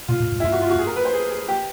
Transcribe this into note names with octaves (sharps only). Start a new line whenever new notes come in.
A#2 F4
A2
G#2
E4
G2 F4
F#4
F4
F#4
G#4
A#4
B4
C5
G#4
G#4
G4